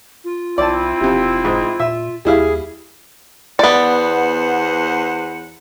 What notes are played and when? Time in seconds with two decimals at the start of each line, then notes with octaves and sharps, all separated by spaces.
0.24 F4
0.58 B1 C4 E4 D5 A5
1.01 E1 F2 C3
1.45 G#2
1.80 A#2 E5
2.25 D#2 G3 E4 G#4 F5
3.59 E2 B3 C5 D5 F#5